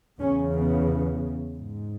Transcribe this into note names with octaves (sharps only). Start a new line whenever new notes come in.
E2 C#3 C#4
B3
G#2